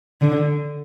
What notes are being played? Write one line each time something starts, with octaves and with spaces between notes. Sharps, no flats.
D3